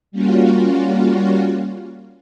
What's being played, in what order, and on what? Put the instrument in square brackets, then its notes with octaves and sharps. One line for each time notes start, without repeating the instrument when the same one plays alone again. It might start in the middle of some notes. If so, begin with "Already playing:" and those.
[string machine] G3 A#3 C#4 F4 F#4